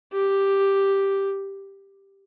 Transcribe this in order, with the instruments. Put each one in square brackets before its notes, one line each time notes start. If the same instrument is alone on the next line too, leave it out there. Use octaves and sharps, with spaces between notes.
[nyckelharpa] G4